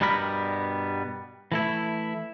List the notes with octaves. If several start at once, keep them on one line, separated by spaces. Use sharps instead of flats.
G2 B2 G3 B3 A#4 B5
E3 A3 E4